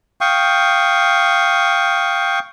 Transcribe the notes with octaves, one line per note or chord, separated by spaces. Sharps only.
F5 G5 C#6 D#6